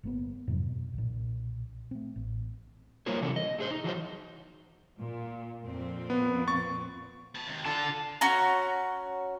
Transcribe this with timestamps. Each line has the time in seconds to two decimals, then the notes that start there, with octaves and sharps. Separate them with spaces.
0.03 G1 A#3 B3
0.47 F2 G#2 C3 F#3
0.66 B2
0.94 B1 A#2
1.91 A3 C4
2.16 A1
3.06 G3 A#3 F4 A#4 C5 C#5
3.21 C3 E3 F#3 D4 A4
3.36 D#5
3.59 A3 G#4 C5
3.71 D#4
3.84 E3 F#3 F#4 C5
4.99 A#2
5.64 F2 A#2 C4
6.10 B3
6.48 C#6 A6
7.35 B3 A5
7.46 D#2 C3
7.66 D3 F4 A5
8.21 C#4 F#4 A#5